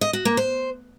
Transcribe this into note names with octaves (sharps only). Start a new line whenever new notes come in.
D#5
F#4
A#3
C5